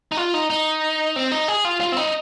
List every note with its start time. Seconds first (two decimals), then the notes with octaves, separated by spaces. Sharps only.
0.12 D#4
0.17 F4
0.34 D#4
0.50 D#4
1.16 C4
1.32 D#4
1.48 G#4
1.65 F4
1.81 F4
1.92 C4
1.97 D#4